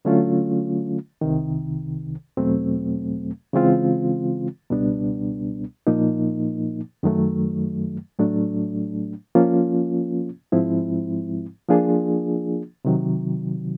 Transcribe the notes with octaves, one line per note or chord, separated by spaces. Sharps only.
D3 F#3 A3 C#4 F4
C2 C3 D#3
E2 B2 F#3 A3 C4
C#3 E3 G#3 C4 F4
C#2 B2 G3 B3 D4
A#2 F3 A#3 D#4
F#2 D#3 F#3 A3
A2 F#3 A3 D4
F3 A#3 C#4 F4
G#2 F3 G#3 C4 E4
F3 A#3 D4 F4 G#4
C3 D#3 F#3